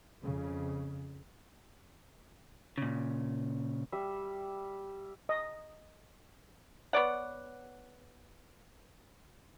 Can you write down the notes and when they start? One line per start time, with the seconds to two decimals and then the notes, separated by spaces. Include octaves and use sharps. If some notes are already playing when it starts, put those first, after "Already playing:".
0.21 F2 C#3
2.78 A#2 C#3
3.92 G3 E5
5.29 D#5
6.93 B3 C#5 D5 F#5